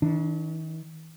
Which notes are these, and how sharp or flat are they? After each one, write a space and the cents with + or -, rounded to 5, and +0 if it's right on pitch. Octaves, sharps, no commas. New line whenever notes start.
D#3 +45 D4 +0